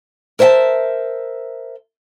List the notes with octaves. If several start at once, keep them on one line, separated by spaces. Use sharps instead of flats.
A#4 C5 E5 F#5 A5